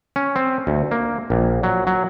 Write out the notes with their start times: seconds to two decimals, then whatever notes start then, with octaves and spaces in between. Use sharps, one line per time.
0.16 C#4
0.36 C4
0.67 D2
0.91 A#3
1.30 A#1
1.63 F#3
1.87 F#3